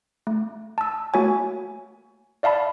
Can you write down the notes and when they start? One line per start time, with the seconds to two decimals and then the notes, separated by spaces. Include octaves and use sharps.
0.27 A3
0.78 A5 E6
1.14 A3 A#3 F#4 C#5 G#5
2.43 D5 E5 F5 A5 B5